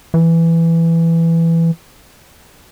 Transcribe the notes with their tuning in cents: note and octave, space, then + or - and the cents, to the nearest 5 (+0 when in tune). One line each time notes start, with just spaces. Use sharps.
E3 +10